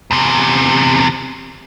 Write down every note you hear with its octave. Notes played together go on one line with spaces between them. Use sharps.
E2 C3